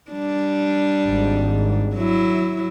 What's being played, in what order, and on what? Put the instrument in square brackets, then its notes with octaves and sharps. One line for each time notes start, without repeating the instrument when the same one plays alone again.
[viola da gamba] G3 D4
[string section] G#1
[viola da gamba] F#3 E4